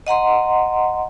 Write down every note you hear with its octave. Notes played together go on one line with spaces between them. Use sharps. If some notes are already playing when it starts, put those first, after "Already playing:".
D#5 F#5 A#5 C6